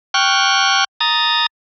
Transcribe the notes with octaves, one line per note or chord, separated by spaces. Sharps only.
G5 C#6 F6 F#6
A#5 D#6 A6